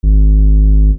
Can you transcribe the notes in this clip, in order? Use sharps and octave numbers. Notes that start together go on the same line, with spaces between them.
G#1